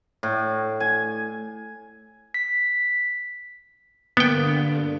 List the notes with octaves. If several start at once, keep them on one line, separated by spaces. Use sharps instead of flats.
A2
G#5
B6
G2 D3 A#3 B3 G5